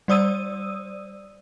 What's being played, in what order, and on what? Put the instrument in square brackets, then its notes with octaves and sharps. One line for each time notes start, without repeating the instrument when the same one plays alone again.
[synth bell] G3 C5 D5 D#6 E6 D#7